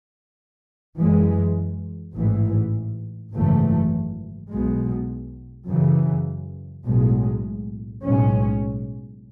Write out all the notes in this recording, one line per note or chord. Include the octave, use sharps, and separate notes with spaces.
F#2 E3 G#3
A1 G#2 E3
G#1 F#2 C#3 E3 A3
B1 B2 G#3
F#2 C#3 E3
B1 A2 G#3
B1 A2 G#3 C#4